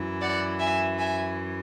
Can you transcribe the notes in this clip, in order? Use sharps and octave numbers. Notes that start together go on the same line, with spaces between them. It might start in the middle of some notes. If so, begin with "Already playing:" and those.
Already playing: F#2 E3
D5 F#5
E5 G#5
E5 G#5